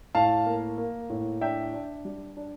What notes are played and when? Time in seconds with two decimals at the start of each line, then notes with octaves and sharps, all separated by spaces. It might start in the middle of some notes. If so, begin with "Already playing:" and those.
0.15 A2 F5 A5
0.46 A#3
0.78 A#3
1.10 A2
1.41 D4 E5 G5
1.74 D4
2.05 G3
2.37 D4